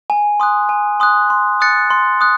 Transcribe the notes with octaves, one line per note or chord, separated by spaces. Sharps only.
G#5
C6 D#6 F#6
G#5
C6 D#6 F#6
C6
D#6 F#6 A6 C#7
C6
D#6 F#6